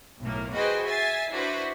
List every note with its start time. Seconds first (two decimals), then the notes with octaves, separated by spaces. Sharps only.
0.21 B1 A2 A#3
0.54 F#4 G#4 B4 C5 D#5 G5
0.85 E5 G#5 A6 C7
1.30 D4 E4 F#4 B4 C5